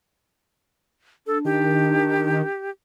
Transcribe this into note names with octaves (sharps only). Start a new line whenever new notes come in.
D4 A4
D#3 G4